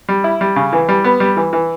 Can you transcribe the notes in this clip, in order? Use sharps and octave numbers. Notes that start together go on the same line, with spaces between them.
G3
E4
G3
C#3
E3
G3
B3
G3
E3
E3